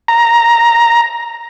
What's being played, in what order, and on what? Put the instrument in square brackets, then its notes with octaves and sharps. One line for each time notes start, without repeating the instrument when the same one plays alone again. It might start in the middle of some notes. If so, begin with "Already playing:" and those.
[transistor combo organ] A#5